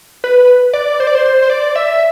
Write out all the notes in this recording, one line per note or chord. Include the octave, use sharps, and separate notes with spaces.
B4
D5
C5
D5
C5
C5
C5
D5
E5